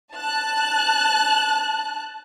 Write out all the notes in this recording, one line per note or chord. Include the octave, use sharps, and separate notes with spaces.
A5 F#6